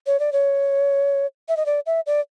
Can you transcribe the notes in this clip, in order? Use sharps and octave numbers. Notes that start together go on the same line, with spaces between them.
C#5
D5
C#5
E5
D#5
D5
E5
D5